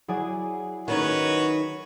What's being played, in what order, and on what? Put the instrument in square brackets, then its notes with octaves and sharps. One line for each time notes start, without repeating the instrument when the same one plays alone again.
[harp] F#3 D5 G#5 [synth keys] E4 G#4
[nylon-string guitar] D#3 C#4 D#4 [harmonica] F#4 B4 C#5